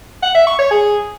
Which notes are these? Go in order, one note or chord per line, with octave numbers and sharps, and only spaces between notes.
F#5
E5
C#6
C#5
G#4